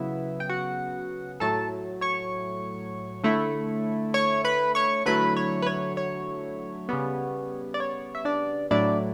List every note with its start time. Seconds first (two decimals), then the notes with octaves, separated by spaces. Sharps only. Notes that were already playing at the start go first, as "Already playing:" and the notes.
Already playing: C#3 F#3 B3 E4 E5
0.40 G5
0.49 F#4 F#5
1.40 A2 F#3 A3 A4 A5
2.01 C#5 C#6
3.24 D3 A3 E4
4.14 C#5 C#6
4.45 B4 B5
4.75 C#5 C#6
5.06 D3 F#3 A3 E4 B4 B5
5.36 C#5
5.62 B4
5.67 C#5
5.97 C#5
6.89 C#3 G3 B3
7.74 D5
7.80 C#5
8.15 E5
8.25 D4 D5
8.71 A2 F#3 A3 D4 E4 D5